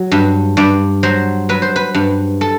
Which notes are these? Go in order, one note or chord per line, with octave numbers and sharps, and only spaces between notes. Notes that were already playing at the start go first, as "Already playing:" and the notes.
Already playing: F#3
G2
G2 D5
F#3 C5
F#3 B4
C5
B4
G2
A4